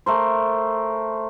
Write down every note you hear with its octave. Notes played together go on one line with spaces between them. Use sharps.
A3 A#4 C5